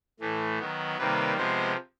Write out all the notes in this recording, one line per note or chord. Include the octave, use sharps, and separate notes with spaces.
A2 E3 A3
D#3 F#3 B3
C3 D#3 G3 A#3 B4
C3 F3 G#3 B3 C5